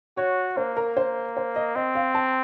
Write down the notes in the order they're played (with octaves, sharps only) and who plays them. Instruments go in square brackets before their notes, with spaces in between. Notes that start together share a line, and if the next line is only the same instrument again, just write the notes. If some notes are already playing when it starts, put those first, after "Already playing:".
[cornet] F#4 [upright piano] C#5
[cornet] A#3 [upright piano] C5
[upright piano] A#4
C5
C5
D#5
[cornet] C4 [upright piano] D#5
[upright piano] F5
A5